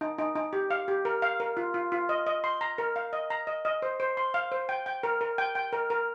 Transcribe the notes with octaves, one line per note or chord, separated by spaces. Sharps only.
D#4
D#4
D#4
G4
F5
G4
A#4
F5
A#4
F4
F4
F4
D#5
D#5
C6
A#5
A#4
F5
D#5
A#5
D#5
D#5
C5
C5
C6
F5
C5
G5
G5
A#4
A#4
G5
G5
A#4
A#4